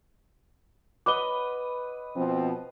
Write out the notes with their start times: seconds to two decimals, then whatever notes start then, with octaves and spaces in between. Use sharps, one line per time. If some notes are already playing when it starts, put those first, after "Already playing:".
1.06 B4 D#5 F#5 D6 G7
2.16 B2 F3 C4